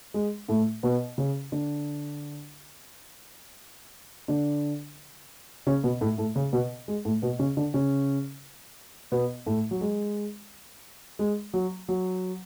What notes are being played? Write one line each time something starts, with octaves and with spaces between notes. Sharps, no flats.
G#3
A2 A3
B2 B3
C#3 C#4
D3 D4
D3 D4
C#3 C#4
B2 B3
A2 A3
A2 A3
C#3 C#4
B2 B3
G#3
A2 A3
B2 B3
C#3 C#4
D3 D4
C#3 C#4
B2 B3
A2 A3
F#3
G#3
G#3
F#3
F#3